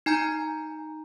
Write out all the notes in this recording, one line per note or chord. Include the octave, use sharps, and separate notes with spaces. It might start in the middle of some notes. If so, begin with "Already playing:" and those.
D#4 G#5 A#5 G6